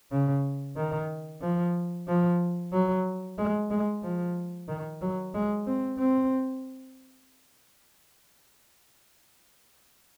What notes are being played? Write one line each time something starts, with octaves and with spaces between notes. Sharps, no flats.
C#3
D#3
F3
F3
F#3
G#3
G#3
F3
D#3
F#3
G#3
C4
C4